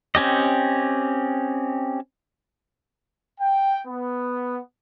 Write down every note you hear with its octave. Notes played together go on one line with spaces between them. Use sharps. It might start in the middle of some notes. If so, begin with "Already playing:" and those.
C4 C#4 G4 D#5
G5
B3